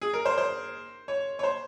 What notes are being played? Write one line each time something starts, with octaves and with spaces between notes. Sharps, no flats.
G#4
A#4
C5
C5
C#5
C#5
C5